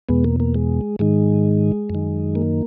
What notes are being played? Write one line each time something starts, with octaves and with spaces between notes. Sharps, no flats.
E2 B2 G#3 B3
A#3
A#3
G#3
G#2 D#3 G#3
F#2
D#3
A#3